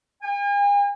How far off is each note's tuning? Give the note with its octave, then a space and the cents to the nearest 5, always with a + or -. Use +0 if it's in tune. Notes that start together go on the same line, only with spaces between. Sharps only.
G#5 -45